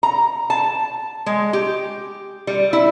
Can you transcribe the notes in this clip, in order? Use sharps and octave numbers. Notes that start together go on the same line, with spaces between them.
A#5
A5
G#3
G4
G3
E4